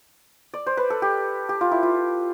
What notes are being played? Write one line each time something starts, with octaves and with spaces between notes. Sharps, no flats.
D5
C5
B4
A4
G4
G4
F4
E4
F4